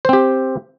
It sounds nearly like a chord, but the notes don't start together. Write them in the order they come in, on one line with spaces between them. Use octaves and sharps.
C5 C4 G4